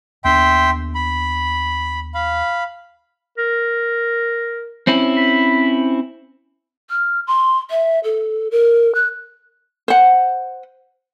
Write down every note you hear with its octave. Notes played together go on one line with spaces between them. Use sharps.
D#2 B3 D4 E5 G5 C6
B5
F5 B5
A#4
C4 C#4 E4
B5
F6
C6
E5
A4
A#4
F#6
C5 F#5